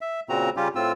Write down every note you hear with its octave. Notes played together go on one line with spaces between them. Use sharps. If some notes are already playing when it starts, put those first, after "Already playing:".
E5
A#2 C#3 C4 F#4 A#5
C#3 G3 C#4 F4 G4
A2 C4 F4 E6